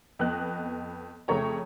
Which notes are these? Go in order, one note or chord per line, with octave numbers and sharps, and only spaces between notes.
F2 B3 D#5 F#6
F2 C#3 A3 C#5 A#5